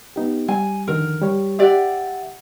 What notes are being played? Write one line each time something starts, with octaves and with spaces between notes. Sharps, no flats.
B3 D#4 G4
G3 G#5
F2 D3 D#3 A#4
G3 G4 C#5
G4 D5 E5 F#5